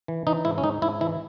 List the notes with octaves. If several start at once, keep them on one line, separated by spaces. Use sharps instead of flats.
E3
E3 D#4
G#2 E4
C#4
G#2 D#4
G#2 E4
E3 E4